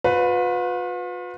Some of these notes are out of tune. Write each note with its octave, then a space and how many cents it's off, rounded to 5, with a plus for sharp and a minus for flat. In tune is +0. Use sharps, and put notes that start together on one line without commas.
F4 +45 B4 +10